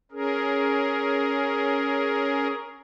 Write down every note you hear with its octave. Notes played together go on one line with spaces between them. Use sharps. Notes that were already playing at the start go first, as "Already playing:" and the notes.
C#4 G#4 A#4